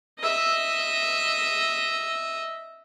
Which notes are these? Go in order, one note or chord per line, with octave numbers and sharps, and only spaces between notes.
D#5 E5